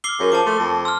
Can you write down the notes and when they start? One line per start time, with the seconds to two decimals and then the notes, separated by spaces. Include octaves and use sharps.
0.04 D6 E6 F6 C7 G7
0.20 F#2 G#4 A#4
0.32 F3 A5 D6
0.46 A3 C6 E6
0.60 F2
0.85 C6 E6 F6